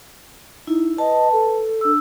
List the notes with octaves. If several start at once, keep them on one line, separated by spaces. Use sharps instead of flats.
D#4 E4
B4 D#5 A5
A4
D4 E6